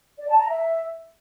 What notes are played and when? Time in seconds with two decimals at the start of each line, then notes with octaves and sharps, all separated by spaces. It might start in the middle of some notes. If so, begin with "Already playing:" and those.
0.18 D5
0.29 A5
0.39 A#5
0.49 E5